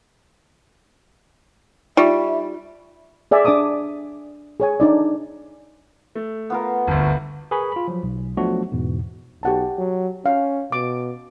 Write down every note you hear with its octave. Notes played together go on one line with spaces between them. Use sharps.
G3 D#4 F4 E5 C#6
G#4 D5 E5 G#5
D4 D5 A5 D6 D#6
G#4 C#5 G#5
D4 D#4 D5
A3
B3 F4 A#4
G1 D2
G#4 A#4 B4 G#5 B5 C#6
F4 B5
F3 F#3
B1
F3 F#3 A3 B3 D4 F#4
E2 G#2 B2
B1 G4 F#5 A5
F#3
C#4 F5
B2 D6